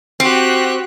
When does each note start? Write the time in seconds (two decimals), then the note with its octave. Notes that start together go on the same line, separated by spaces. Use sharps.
0.20 C4 F#4 G4 F#6